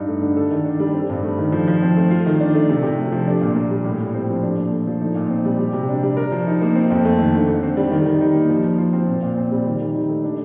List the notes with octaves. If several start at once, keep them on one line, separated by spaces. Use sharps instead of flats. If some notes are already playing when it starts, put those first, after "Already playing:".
Already playing: G2 D#4
A3
D3
A4
D#3
D4
G3
C4
G2
A3
D#3
F3
F3
C4
A3
F4
D#3
D4
A3
C3
C3
A3
F3
D4
A#2
A#3
G3
A2
A2
C4
F3
D4
A#2
A3
F3
D#4
A#2
C4
G3
G4
C3
D4
G3
A#4
F3
D#4
A#3
C4
F2
A3
D#3
D3
D3
C4
G3
D#3
D#3
D#4
A#3
F3
F3
F4
C4
A#2
A#2
C4
G3
D#3
D#3
D#4
A3
D4